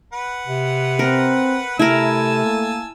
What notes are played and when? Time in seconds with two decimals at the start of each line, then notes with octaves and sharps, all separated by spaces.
0.13 B4 F#5
0.47 C3
0.99 C4 A#4
1.79 C3 A3 E4 A#4 G#5 A5 E6
2.45 A#3